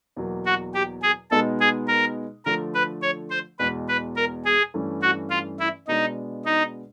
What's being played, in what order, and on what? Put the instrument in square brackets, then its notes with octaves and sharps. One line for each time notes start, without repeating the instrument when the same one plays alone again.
[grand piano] E2 B2 F#3 A#3
[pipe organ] F#4
G4
G#4
[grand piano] B2 G#3 B3 D#4 [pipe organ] A4
[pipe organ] G#4
A#4
[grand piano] D3 F3 A3 [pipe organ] A#4
[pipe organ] B4
C#5
C5
[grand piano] E2 B2 G#3 [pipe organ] B4
[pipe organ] B4
A#4
G#4
[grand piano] G2 E3 A3 C#4
[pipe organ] F#4
F4
E4
[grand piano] B2 G#3 B3 D4 [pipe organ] D#4
[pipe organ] D#4